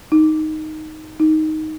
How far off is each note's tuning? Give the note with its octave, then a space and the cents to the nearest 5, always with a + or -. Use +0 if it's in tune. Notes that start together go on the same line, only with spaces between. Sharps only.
D#4 +0
D#4 +5